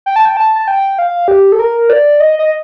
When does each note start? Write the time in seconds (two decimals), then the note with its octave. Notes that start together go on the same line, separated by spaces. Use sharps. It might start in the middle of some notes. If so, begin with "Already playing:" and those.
0.06 G5
0.16 A5
0.25 G5
0.37 A5
0.56 A5
0.68 G5
0.99 F5
1.28 G4
1.52 A4
1.59 A#4
1.90 D5
2.20 D#5
2.39 D#5